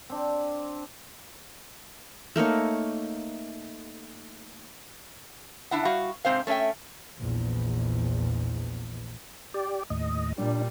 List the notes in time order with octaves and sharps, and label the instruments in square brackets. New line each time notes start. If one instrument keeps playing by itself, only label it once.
[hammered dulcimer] C4 D4
[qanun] A3 A#3 D#4 C#5
[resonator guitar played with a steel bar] C#3 D4 E4 F#5
G3 F#4 F5
G#2 C3 C4 C5 F5
A3 C#4 A4 E5 G5
[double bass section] A#1 E2
[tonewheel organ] G4 D5
D#2 A2 D#5
[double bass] A#2 G3 [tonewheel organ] D4